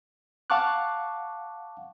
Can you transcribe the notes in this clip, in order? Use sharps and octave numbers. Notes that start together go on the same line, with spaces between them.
F5 F#5 A5 C#6 D6 F#6